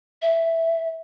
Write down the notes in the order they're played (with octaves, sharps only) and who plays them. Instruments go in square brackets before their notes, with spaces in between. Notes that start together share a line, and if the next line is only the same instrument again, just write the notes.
[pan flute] E5